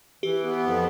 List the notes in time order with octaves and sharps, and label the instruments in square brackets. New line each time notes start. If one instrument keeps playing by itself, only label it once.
[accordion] E3 [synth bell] G4
[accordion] B3
F2